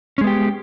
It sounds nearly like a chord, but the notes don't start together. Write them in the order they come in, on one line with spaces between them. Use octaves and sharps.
C#4 G#3 B3 G4